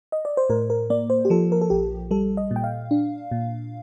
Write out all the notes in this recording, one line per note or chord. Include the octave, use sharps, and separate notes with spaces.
D#5
D5
C5
A2 A#4
A#4
A#3 D5
C5
G4
F3 A4
A#4
A4
A#1 G4
G3 A4
D#5
A#2
G5
F5
D4
A#2